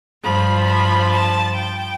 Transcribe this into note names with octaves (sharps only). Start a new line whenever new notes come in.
G2 F3 B5
B5
A5
G5